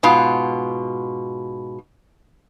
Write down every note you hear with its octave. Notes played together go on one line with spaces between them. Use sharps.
G#2 B2 F4